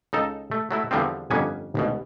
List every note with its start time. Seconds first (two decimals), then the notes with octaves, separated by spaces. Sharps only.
0.13 C#2 D#4 A4
0.51 A3
0.71 F#3 A3 E4
0.91 E2 D3 F3 G3 C4
1.30 G1 F2 A#3 B3 C#4 G#5
1.75 G#1 D2 B2